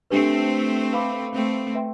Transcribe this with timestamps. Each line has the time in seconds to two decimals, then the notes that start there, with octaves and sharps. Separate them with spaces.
0.10 A3 C4 D4 G4 B4
0.93 B4 F5 B5 D6
1.34 A3 C4
1.75 B4 E5 G5 C6